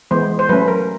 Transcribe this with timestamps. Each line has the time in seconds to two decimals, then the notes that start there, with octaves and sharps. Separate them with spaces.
0.11 E3 G#3 B3 C5
0.39 C5
0.49 F#3 A3 C#4 B4
0.68 A#4